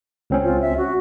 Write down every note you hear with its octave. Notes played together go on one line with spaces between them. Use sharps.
C#2 C4 C#4
F4
E5
F#4